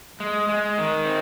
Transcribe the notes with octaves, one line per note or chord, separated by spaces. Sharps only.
G#3
G#3
D#3
C4